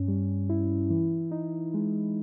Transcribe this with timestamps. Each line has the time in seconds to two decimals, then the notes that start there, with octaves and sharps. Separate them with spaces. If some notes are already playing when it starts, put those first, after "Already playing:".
Already playing: G2 C#4
0.08 G3
0.49 E4
0.90 E3
1.31 D#4
1.74 G#3